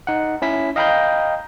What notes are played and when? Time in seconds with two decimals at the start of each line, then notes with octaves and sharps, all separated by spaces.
0.07 D#4 F#5
0.42 C#4 E4 B6
0.76 D#5 F5 G5 A#5 B5 G6